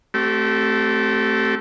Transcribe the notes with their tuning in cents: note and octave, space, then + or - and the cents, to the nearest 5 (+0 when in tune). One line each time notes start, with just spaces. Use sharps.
A3 +0 C4 +0 G4 -35